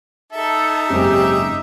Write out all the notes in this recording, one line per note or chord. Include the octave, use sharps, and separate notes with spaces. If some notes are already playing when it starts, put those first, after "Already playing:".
D#4 A4 E5
F#1 G#2 C3 C#4 G4